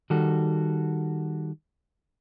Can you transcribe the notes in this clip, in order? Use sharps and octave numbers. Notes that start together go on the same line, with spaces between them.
D#3 G3 F#4 A4